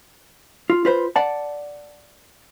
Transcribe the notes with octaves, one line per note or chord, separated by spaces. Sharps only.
F4
F4 B4 C5
D5 F#5 A5